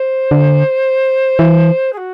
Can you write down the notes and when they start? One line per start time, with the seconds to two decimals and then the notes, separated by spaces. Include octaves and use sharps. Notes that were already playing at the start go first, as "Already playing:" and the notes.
Already playing: C5
0.31 D3
1.39 E3
1.93 G#4
1.97 F#4